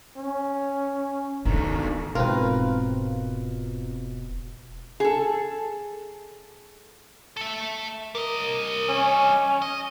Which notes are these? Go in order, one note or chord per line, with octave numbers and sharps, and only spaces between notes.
C#4
D#3 A3 D4
E1 G#2 B2 C4 F4 A#4 B4
G#4 A4
A4 E5
G3 A#4 D#5
C#4
D#5